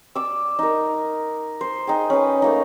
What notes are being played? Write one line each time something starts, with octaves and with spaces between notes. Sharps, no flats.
D5 D6 E6
D#4 A#4
C5
D#4 G#4 G5
C#4 B4
A3 A#3 D#4